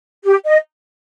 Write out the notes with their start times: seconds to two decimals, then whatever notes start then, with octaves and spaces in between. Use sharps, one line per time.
0.25 G4
0.45 D#5